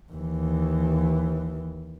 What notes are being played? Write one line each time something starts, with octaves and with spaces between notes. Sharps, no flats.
D#2 E3